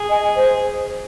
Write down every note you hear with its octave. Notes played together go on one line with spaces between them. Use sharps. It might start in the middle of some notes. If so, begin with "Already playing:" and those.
Already playing: G#4
D#5 G#5
C5